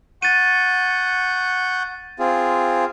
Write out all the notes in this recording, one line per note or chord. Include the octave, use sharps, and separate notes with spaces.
F#5 C#6 G6 A6 D#7
C4 F4 G#4